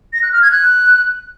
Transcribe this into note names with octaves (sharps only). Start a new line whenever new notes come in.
A#6
F#6
F6
G#6
F#6